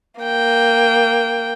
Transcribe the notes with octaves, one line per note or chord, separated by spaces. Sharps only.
A#3 G5